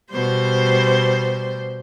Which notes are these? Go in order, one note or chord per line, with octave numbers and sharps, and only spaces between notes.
B2 G3 C5